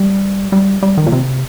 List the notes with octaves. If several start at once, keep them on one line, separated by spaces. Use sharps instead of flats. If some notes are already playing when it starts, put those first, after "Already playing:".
Already playing: G3
G3
G3
D#3
A#2
C3